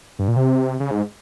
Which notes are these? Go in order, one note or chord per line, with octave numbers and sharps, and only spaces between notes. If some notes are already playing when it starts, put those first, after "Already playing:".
G2
A#2
C3
C#3
G#2